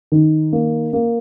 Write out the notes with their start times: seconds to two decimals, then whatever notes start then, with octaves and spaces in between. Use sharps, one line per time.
0.12 D#3
0.53 A#3
0.93 A#3